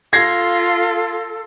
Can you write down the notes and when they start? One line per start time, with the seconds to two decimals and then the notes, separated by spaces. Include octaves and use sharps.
0.13 F4 A4 G#6 A#6 C7